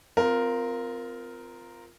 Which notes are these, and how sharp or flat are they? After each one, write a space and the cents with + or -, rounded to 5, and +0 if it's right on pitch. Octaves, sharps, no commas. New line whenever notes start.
C4 -30 F4 +0 A#4 +0